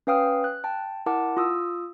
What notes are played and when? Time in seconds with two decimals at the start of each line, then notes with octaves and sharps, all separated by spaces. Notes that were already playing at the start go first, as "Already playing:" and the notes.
0.07 C#4 B4 F5 G5 D#6 F6
0.44 F#6
0.64 G5 A5
1.06 E4 A#4 F#5 A5 D6
1.37 F4 D#6 E6